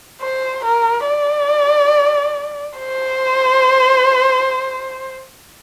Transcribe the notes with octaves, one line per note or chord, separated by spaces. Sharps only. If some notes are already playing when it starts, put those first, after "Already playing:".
C5
A#4
D5
C5